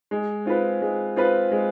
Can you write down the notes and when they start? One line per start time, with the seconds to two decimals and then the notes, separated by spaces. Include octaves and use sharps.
0.11 G#3
0.45 C4 F4 B4
0.82 G#3
1.16 C4 F4 B4
1.51 G#3